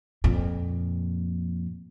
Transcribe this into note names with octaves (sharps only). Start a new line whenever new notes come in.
F2 A#2